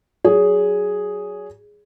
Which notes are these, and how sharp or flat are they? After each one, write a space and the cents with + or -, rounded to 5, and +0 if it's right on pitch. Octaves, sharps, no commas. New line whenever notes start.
F#3 +15 G#4 +0 C#5 +40